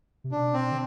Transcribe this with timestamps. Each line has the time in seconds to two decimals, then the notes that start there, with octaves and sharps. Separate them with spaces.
0.24 C3
0.31 B2 D4
0.54 C4
0.71 D3